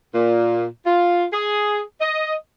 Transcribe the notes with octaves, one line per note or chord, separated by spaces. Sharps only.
A#2
F4
G#4
D#5